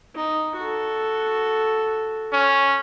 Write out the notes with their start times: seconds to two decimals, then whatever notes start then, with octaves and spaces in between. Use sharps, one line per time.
0.15 D#4
0.57 F#4 A4
2.33 C#4